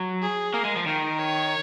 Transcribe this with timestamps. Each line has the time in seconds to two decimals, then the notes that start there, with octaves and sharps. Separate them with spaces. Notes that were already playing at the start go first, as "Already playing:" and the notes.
Already playing: F#3
0.22 G#4
0.54 A#3 A#4
0.65 G#3
0.76 F3
0.86 D#3 A#4
1.19 C#5